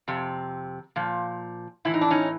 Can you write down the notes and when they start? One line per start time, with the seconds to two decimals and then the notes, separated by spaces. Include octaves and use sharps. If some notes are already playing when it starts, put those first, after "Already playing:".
0.08 F2 C3
0.96 A#2 F3
1.85 A2 E3 E4
1.94 D#4
2.01 D4
2.10 C#4 D#4